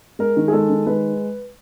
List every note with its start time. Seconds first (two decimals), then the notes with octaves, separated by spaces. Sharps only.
0.19 G#3 A#4
0.37 D#3
0.48 G#4
0.53 G#3 A4
0.70 D#3
0.86 G#3 B4